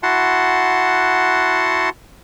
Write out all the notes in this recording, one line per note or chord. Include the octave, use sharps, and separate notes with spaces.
E4 F#4 F#5 A5 C6